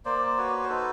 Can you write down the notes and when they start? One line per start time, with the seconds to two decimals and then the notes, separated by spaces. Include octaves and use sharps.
0.05 A#3 C5 D5
0.38 F#4 B4 C#5
0.63 C5
0.69 D#4 A4 B4